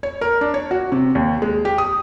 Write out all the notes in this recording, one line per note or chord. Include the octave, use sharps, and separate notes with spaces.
C#5
A#4
D4
C#5
F#4
C3
D#2
G#3
G4
D#6